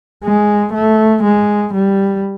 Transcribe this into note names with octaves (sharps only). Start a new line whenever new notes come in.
G#3
A3
G#3
G3